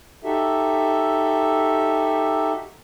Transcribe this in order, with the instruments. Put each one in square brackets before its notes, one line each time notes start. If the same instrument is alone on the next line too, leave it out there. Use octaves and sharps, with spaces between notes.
[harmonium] D#4 F#4 G4 A4 E5